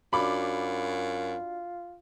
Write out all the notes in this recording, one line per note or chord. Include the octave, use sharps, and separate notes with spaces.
F#2 D4 F4 F#4 B5 D6